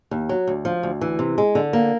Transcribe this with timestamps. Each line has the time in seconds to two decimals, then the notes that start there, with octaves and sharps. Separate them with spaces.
0.11 D#2
0.29 F#3
0.47 D2
0.65 F3
0.83 D2
1.01 E3
1.19 C3
1.38 G#3
1.55 D3
1.73 A#3